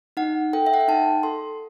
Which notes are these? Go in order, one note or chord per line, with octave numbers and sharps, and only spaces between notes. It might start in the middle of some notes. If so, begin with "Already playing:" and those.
D#4 F#5
A4 G5
E5
F#5
G5
D#4 A5
A4 C6